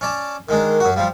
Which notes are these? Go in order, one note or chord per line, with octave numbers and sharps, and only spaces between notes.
C#4 D5 A5
D#3 G#3 D4 A#4
F#2 F#4
F3 G3 F5